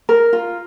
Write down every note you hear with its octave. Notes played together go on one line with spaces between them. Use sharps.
A#4
F4